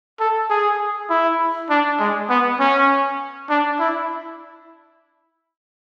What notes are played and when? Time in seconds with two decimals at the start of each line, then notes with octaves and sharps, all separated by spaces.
0.20 A4
0.50 G#4
1.10 E4
1.70 D4
2.00 G#3
2.30 B3
2.60 C#4
3.49 D4
3.80 E4